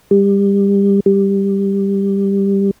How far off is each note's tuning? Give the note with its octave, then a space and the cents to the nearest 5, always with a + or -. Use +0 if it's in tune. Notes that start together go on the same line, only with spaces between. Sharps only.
G3 +25
G3 +10